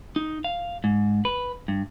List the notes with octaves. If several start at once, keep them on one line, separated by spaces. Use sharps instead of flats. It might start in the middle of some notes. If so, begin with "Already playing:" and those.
D#4
F5
G#2
B4
G2